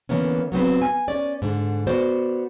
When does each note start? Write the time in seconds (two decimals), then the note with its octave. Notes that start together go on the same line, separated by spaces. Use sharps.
0.09 D3 E3 A#3 B3 C#4
0.52 F#3 B3 C4 B4
0.82 G#5
1.08 C#4 D5
1.42 G#2 D3
1.87 B3 F#4 C5 D5